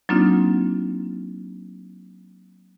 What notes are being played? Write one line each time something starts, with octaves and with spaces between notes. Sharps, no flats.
F#3 A#3 C4 D4 D#4 F4